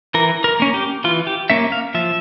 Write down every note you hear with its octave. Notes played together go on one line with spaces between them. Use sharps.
E3 A#4
A#4
A#3 C#4
G4
E3 F4
G4
A#3 C#4 E5
F5
F3 E5